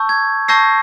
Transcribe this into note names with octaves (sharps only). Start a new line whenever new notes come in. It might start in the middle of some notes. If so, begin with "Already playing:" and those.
Already playing: A5 C#6 E6 G6
G#6
A5 C#6 E6 G6 A#6 C7